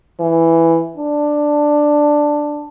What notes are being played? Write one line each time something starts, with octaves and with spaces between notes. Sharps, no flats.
E3
D4